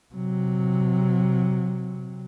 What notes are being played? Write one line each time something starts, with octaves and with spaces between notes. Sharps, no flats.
C3 F#3